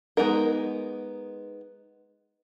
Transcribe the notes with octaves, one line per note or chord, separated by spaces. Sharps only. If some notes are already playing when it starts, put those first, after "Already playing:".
G#3 A3 B3 D#4 A#4